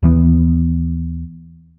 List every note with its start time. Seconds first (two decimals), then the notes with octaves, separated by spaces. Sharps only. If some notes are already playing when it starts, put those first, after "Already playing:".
0.03 D#2 E3 B3